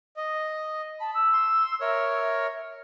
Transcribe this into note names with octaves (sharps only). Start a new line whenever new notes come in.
D#5
A5 B5
E6
C6
A#4 C#5 E5